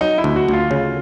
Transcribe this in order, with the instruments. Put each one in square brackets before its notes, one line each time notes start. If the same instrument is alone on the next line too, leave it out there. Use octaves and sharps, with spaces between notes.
[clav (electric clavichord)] F#3 [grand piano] D#4
[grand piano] E4
[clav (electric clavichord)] D2
[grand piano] F#4
[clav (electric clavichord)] D2 [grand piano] F4
[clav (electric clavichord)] C#3